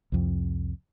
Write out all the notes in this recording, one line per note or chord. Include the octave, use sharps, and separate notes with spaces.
C2 F2